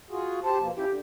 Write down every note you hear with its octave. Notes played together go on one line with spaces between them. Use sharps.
F4 F#4 G#4
G4 C5 A5
B2 F3 A#3
F3 C#4 E4 G4
D3